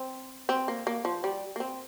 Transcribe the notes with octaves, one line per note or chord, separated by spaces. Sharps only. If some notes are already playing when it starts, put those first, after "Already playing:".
Already playing: C4
C4
A#3
A#3
F3
G3
A#3
C4